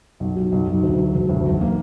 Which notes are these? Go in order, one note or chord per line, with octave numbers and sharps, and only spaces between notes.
B1
F#3
B1
B1
D2
F#3
E1
D2
B1
A#3